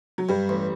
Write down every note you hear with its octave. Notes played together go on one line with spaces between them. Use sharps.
F#3
G2 G3
A1